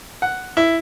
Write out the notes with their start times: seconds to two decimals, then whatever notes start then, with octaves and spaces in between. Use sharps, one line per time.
0.22 F#5
0.57 E4